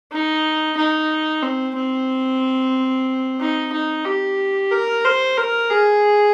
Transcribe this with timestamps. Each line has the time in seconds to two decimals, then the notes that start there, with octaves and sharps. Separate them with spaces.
0.12 D#4
0.77 D#4
1.43 C4
1.75 C4
3.40 D#4
3.72 D#4
4.05 G4
4.71 A#4
5.05 C5
5.37 A#4
5.70 G#4